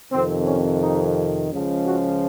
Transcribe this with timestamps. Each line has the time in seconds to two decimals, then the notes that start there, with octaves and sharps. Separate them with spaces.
0.11 F2 C3 D#3 C4
0.45 C#4
0.80 D#4
1.50 C#2 C#3 F3
1.85 F#4